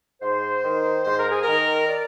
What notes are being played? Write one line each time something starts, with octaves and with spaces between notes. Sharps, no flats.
G#2 C5
D#3
G#2 C5
A#4
G#4
D#3 A#4
D5